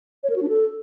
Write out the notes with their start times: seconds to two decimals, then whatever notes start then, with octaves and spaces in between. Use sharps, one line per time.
0.23 C#5
0.30 A#4
0.36 F#4
0.42 D4
0.49 A4